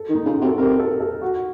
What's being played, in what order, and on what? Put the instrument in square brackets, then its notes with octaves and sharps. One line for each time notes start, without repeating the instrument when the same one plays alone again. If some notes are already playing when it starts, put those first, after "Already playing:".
Already playing: [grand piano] A4
[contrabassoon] D#3
[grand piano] D#4
[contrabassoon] C#3 [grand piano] F4
[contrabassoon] C3 [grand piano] F#4
[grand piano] A4
[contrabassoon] C3 [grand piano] A#4
[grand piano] A4
A4
F#4